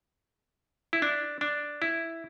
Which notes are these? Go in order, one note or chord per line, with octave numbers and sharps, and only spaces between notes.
E4
D4
D4
E4